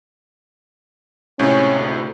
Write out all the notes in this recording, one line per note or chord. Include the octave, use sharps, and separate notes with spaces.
C#2 A2 C3 C#4
D2